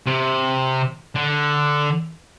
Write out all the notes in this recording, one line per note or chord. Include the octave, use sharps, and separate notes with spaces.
C3
D3